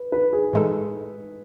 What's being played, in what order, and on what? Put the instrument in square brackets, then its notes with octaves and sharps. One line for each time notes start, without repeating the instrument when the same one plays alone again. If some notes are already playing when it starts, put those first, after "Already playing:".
Already playing: [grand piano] B4
B4
G#4
[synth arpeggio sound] A2 E3 G#3 D#4 A4